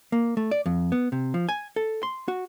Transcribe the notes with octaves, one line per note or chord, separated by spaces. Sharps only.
A#3
A3
D5
F2
B3
C3
F3
G#5
A4
C6
F#4